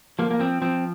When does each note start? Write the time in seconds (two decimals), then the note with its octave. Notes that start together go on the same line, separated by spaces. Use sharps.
0.19 F3 A#3
0.31 A#3
0.39 F3 C4
0.62 F3 C4